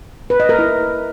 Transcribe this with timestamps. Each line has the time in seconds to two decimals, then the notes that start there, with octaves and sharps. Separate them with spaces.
0.30 B4
0.40 D#5
0.49 A#4
0.59 E4